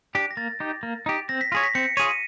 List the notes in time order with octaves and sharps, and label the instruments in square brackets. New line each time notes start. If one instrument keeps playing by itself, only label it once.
[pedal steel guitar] D4 G4
[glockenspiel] A#6
[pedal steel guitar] A#3 [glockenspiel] A6
[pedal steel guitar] D#4 G4
A#3
D#4 G4
[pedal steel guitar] C4 [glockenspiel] A#6
[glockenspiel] B6
[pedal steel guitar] F4 G#4 C#5 [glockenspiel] A#6
[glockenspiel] B6
[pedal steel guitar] C4 [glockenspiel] C#7
[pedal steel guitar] F4 G#4 C#5 [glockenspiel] D#7